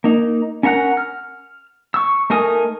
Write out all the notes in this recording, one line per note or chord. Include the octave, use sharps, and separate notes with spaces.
A#3 D#4
C#4 A#4 F#5 A#5 F#6
F6
C#6 E6
A3 D#4 A#4 G#5 D#6